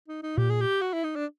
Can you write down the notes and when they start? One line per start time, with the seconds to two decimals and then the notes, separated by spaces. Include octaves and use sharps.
0.08 D#4
0.23 D#4
0.38 A#2 G4
0.50 G#4
0.61 G4
0.81 F#4
0.93 E4
1.04 D#4
1.16 D4